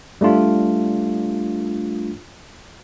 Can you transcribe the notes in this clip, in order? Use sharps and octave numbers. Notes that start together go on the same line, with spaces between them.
G3 A3 D4 F4